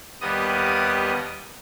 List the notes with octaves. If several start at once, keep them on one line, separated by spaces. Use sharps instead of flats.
D#2 G3 B3 D#5 D#6